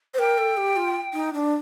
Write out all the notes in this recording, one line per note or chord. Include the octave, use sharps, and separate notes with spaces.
C5
A#4 G5
A4
G4
F4
D#4
D4